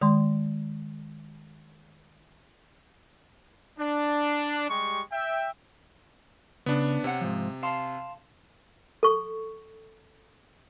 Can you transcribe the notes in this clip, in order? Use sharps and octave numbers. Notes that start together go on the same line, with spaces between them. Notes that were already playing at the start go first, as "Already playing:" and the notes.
D#3 G#3 C6
D4
G3 G#3 G4 C#6
E5 G5
C#3 B3 D4
C3 C#5 F#5
G#2 F3
F5 A5 C6
A4 C#6